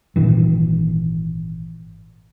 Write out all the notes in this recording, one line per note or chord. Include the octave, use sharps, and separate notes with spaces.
G#1 A#2 D#3 E3